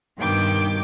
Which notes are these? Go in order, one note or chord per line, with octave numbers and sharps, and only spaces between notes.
G2 B2 D#3 G5 D6